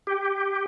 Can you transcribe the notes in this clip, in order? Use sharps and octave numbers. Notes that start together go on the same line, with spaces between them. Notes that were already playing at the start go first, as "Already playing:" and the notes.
G4